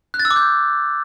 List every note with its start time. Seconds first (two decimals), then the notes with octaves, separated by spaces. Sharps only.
0.14 F#6
0.19 A6
0.25 E6
0.31 D6
0.36 G6